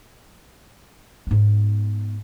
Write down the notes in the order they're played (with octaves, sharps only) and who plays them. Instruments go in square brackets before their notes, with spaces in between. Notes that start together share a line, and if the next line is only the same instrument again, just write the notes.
[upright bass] G#2 B3